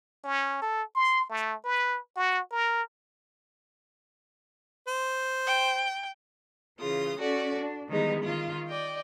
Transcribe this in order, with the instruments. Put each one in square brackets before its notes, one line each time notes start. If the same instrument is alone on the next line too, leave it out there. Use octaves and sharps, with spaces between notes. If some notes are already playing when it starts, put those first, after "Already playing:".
[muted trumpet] C#4
A4
C6
A3
B4
F#4
A#4
[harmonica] C5
[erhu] G5
[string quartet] C#3 E3 F4 D#6
C#4 F#4 A4 D5
D4
D#3 E3 G3 G#3 B3 D#4
D#3 F4
D5 D#5 G5